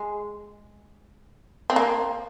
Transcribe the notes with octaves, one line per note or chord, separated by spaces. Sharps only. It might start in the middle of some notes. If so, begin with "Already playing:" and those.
Already playing: G#3
C4
A#3